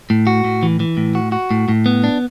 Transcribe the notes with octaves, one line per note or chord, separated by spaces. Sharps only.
A2
F#4
A2
E3
E3
A2
F#4
F#4
A2
A2
B3
D4